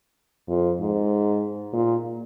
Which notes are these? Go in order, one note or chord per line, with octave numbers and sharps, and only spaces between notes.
F2
G#2
A#2